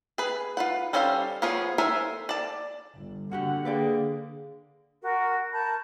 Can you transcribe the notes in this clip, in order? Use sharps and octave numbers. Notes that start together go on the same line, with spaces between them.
G#4 B4
F4 B4 F#5
G3 C#4 A4 C5 F5
F3 B3 F4 G#4 C#5
A4 A#4 C5 E5 G#5
D5 A5
G1
D3 A#3 F#4 G4 F#5
A#3 G#4 B4 D5 G5
F#4 A#4
A#4 A5 B5 G6